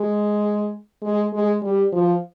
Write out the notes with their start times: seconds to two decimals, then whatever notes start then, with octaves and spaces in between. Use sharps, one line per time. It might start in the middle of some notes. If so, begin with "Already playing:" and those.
Already playing: G#3
1.03 G#3
1.33 G#3
1.63 G3
1.92 F3